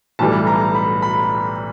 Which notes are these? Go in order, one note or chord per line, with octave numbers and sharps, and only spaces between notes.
B1 A2 E3 G3 A5
A#5
B5
B5